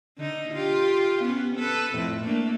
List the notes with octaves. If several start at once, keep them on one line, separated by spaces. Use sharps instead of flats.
D3 D#4
F4 G4
B3 C#4
A4 B4
F2 A2
A3 A#3 D4